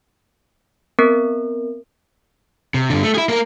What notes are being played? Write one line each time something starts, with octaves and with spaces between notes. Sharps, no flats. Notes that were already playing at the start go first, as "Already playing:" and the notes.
B3 C4 A#4
C3
G2 D3
A3
E4 G#4
A#3 A#4